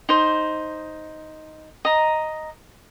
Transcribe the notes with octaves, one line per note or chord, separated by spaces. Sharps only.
D#4 C5
D#5 A#5